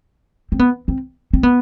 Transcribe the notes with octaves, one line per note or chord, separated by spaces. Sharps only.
C4
B3
C4
C4
B3